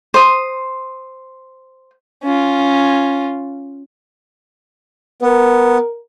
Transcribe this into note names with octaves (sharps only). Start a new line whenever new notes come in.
C5 D#6
C#4 F4
B3 A#4